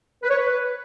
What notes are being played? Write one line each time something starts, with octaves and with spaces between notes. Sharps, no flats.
B4
C#5
B4